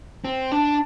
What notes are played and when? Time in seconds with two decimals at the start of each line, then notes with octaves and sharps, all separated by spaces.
0.25 C4
0.52 D4